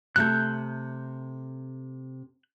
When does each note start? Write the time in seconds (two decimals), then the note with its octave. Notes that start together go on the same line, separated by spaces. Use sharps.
0.16 C3 A3 A4 F#6 G6